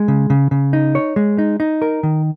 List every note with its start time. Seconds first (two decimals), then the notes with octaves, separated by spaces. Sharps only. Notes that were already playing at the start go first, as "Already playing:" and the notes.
Already playing: G#3
0.08 C#3
0.30 C#3
0.51 C#3
0.73 D#4
0.95 C#5
1.16 G#3
1.38 D#4
1.60 D#4
1.82 A#4
2.03 D#3